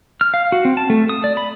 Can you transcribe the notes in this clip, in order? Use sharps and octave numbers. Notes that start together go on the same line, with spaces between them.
F6
F5
F#4
C4
A5
A3
D#6
D5
B5